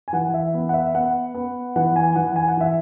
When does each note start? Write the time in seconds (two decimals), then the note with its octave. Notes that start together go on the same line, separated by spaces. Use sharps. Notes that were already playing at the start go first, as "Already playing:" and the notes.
0.08 G#5
0.13 E3 F#5
0.34 E5
0.54 B3
0.69 F#5
0.74 E5
0.94 B3 F#5
1.35 B3
1.76 E3 F#5
1.96 G#5
2.16 E3 F#5
2.36 G#5
2.48 F#5
2.57 E3 E5